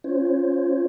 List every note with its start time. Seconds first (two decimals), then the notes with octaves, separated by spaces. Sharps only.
0.04 C#4 F4 C5 C#5